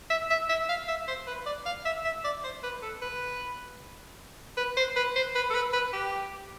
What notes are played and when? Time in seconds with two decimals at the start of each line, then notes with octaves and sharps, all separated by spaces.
0.10 E5
0.30 E5
0.49 E5
0.69 F5
0.88 E5
1.08 C5
1.27 B4
1.46 D5
1.66 F5
1.85 E5
2.05 E5
2.24 D5
2.44 C5
2.63 B4
2.82 A4
3.02 B4
4.57 B4
4.77 C5
4.96 B4
5.16 C5
5.35 B4
5.50 A4
5.54 B4
5.73 B4
5.93 G4